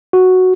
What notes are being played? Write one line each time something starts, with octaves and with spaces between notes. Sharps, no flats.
F#4